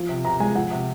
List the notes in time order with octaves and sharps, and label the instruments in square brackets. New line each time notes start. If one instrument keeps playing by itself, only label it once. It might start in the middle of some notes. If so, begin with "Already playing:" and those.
Already playing: [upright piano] F3
C3
[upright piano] C3 [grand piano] A#5
[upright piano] G#3 [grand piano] G#5
[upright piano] F3 [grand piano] F#5
[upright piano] C3